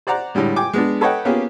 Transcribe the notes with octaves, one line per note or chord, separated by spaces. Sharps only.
C5 D5 F#5 A#5
A2 D3 G3 G#3
G5 G#5 D6
G#3 B3 D4
A4 B4 C#5 D#5 F#5 G5
A#3 B3 C#4 F4 G4 G#4